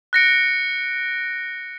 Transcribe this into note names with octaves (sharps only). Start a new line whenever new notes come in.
F#6 A#6 C#7 D7